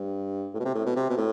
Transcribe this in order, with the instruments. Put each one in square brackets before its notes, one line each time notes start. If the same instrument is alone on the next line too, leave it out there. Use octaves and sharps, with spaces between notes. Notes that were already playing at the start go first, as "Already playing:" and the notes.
Already playing: [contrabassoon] G2
A2
B2
C3
A2
B2
C3
B2
A2